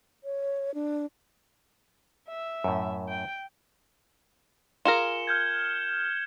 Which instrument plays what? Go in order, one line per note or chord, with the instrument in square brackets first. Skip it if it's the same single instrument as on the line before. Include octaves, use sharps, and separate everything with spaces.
[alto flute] C#5
D4
[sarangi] E5
[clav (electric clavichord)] F#2 A2
[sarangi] G5
[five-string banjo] F4 G#4 A#4 [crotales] C#7 E7 G7
[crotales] F6 G6 G#6